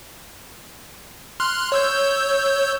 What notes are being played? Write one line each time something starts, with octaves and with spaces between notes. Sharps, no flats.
C6 F6 F#6
C#5 E6 G6